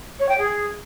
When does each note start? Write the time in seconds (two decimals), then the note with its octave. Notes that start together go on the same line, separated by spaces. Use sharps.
0.19 C#5
0.28 G5
0.38 G#4